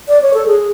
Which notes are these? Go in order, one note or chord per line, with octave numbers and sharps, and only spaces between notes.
D5
C#5
A4
G#4